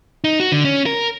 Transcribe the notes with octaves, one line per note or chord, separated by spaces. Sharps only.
D#4
F#4
D3
C#4
A#4